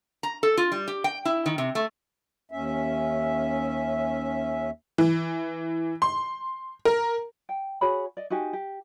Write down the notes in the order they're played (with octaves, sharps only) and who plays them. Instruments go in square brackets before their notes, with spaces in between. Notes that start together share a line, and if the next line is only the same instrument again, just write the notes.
[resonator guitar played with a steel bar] A#5
A4
F4
G3
G4
G5
E4
D#3
C3
A3
[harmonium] D#2 C#4 E5
[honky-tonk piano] E3
C6
A#4
[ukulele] G5
F#4 G#4 C#5 B5
D5 D#5
D#4 F#4 G4 G#5
G4